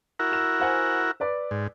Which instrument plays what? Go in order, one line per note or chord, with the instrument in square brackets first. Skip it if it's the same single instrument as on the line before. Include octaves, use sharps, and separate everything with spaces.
[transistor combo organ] E4 F#4 A#4
[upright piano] E6 E7
C5 F#5 G#5
B4 D5 D6
[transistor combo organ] G#2